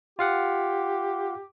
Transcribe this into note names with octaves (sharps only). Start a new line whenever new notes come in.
F4 G4 F5 F#5